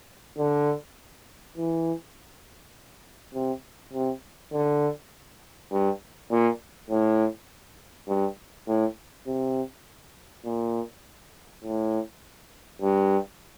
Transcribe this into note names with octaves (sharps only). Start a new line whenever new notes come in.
D3
E3
C3
C3
D3
G2
A#2
A2
G2
A2
C3
A#2
A2
G2